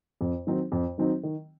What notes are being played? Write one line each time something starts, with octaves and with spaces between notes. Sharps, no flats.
F2
D#3 F#3 C4 D#4
F2
D#3 F#3 C4 D#4
D#3